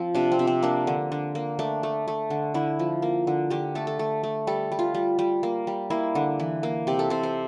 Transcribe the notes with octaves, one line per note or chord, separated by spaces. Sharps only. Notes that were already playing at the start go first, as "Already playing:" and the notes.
Already playing: F3 C4
C3 D4
C4
C3
C4
A#3 D4
D3
D3
A#3
A3 D4
A3
A3
D3
D3 E4
F3
A#3
D3
D3 G4
A3 A4
A4
A3
A3
G3 A4
G3
F4
G3
G3
A#3
G3
A#3 E4
D3
E3
A#3
C3 G4
A4
C3 C5
C5